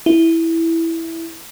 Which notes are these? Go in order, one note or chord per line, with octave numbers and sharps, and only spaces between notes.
E4